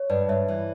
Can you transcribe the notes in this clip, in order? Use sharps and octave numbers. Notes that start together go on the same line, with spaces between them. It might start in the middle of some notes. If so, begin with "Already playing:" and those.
Already playing: C#5
G2 B4 D5
G2 C#5 E5
E3